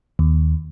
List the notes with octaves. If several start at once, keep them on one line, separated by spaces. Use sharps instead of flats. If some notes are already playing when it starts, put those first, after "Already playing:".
D#2